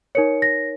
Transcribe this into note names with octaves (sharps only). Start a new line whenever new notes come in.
D#4 A#4 C#5 C#7
A#6